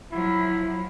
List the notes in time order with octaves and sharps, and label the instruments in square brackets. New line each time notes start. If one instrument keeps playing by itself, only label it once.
[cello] F3 F#3 [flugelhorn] E4